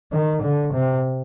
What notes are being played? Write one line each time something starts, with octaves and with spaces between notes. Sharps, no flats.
D#3
D3
C3